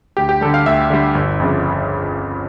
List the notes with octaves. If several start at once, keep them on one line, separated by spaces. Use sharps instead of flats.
D2 G4
G4
D3 G3 A4
F5
D2 E5
D3 G3
G1
F2 C#3